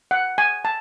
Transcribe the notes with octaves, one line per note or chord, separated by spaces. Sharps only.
F#5
G#5
A5